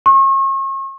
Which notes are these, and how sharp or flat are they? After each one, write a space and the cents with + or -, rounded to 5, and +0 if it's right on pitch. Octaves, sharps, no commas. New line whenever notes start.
C#6 -40